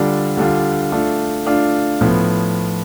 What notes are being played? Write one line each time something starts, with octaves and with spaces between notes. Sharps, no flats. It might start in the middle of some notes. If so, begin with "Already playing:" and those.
Already playing: D3 G3 D4 F4
D3 G3 D4 F4
A3 D4 F4
A3 D4 F4
A2 F3 B3